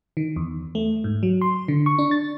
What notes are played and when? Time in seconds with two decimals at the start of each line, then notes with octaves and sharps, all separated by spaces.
0.17 D#3
0.36 E2
0.75 A3
1.04 G#2
1.23 F#3
1.41 C6
1.68 D3
1.86 C#6
1.99 D4
2.11 A6